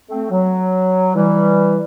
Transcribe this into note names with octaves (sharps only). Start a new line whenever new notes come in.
A3 C4
F#3
E3 G3